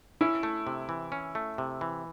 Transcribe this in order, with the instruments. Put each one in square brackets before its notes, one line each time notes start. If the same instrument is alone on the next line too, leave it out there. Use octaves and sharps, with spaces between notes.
[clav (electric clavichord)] C#4 [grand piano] E4
[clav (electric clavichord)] A3
C3
E3
C#4
A3
C3
E3